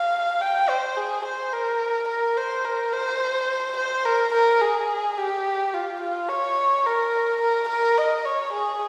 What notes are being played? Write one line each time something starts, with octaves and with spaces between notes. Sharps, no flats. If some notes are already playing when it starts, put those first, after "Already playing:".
Already playing: F5
G5
C5
G#4
C5
A#4
A#4
C5
A#4
C5
C5
A#4
A#4
G#4
G4
F4
F4
C#5
A#4
A#4
A#4
D#5
C#5
G#4